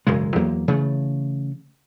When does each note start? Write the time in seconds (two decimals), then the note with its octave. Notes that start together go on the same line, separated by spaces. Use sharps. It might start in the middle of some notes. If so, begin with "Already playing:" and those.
0.07 E1 F#2 C#3 G#3
0.36 E2 F#3 A#3
0.68 C#3 E3 A3